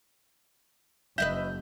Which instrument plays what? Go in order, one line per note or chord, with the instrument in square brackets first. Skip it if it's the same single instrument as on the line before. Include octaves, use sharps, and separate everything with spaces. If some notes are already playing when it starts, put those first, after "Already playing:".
[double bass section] F#1 [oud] B4 D#5 E5 [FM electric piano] G6